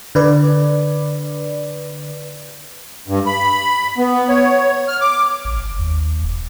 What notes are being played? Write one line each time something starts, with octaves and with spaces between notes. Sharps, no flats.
D3 B4 D5
G2
B5
B3
C#5
F6
D6
A1
G1
D#2
E1